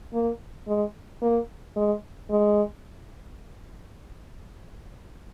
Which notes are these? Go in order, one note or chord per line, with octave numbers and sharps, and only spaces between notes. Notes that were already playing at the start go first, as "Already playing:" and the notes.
A#3
G#3
A#3
G#3
G#3